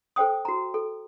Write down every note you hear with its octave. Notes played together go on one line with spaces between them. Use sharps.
A4 C5 G5 D#6
F#4 A#5
A4